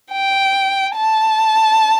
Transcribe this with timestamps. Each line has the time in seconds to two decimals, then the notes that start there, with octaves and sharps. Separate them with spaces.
0.12 G5
0.96 A5